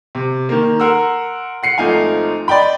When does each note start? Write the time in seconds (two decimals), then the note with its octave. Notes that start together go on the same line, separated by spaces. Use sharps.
0.15 C3
0.49 D#3 A#3
0.80 A#4 F#5 C6 E6
1.63 F#5 C7 C#7
1.78 G#1 F3 A3 D#4 F5 G#5
2.48 D5 D#5 G5 B5